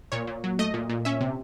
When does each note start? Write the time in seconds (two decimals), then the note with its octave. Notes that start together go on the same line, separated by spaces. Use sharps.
0.12 A#2 C#5
0.27 A#2
0.44 F#3
0.59 A3 D#5
0.74 A#2
0.89 A#2
1.05 C#4 E5
1.21 C3